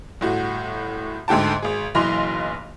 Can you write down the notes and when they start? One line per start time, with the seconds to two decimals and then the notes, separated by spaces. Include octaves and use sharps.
0.21 G1 A2 F#4
1.28 D2 G#2 D3 G5 A5
1.62 G#1 G#4
1.94 F#1 B1 E3 C6 F7